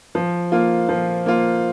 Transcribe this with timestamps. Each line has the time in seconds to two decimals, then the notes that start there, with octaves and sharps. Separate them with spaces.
0.15 F3
0.52 A#3 F4
0.89 F3
1.26 A#3 F4